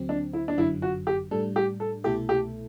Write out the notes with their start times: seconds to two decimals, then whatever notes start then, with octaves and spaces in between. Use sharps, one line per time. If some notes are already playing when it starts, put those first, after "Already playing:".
Already playing: D2 D3 F#3 C4
0.09 D4
0.33 E4
0.48 D4
0.57 G1 F#2 D3 F#3 E4
0.82 F#4
1.07 G4
1.31 A2 G3 D4 A4
1.56 G4
1.80 A4
2.04 C2 B2 A3 E4 G4 A4
2.29 G4